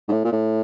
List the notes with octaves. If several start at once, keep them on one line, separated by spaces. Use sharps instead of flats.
G#2
A2
A#2
A2